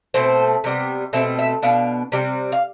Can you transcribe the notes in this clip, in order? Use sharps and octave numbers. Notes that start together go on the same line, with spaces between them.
B2 A3 C4 C5
C3 G3 B3
B2 A3 C4 E5
E5
B2 B3 D4 F5
C3 G3 C4
F5